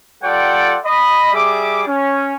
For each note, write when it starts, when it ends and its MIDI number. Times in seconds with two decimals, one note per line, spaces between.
0.23 0.77 55
0.23 0.77 65
0.23 0.77 69
0.23 0.77 74
0.23 0.77 78
0.23 0.77 79
0.86 1.32 75
0.86 1.32 83
1.33 1.82 55
1.33 1.82 68
1.33 1.82 76
1.33 1.82 86
1.88 2.35 61